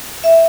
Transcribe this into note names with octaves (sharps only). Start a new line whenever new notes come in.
E5